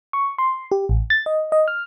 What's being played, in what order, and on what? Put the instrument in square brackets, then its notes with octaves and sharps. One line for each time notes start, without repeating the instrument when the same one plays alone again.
[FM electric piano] C#6
C6
G4
A1
A6
D#5
D#5
F6